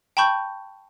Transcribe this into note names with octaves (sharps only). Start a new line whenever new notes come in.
G5 A5 B5 C#6 G6